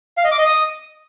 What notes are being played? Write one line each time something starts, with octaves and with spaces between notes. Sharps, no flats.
F5
D#5
D6
D#5
D#6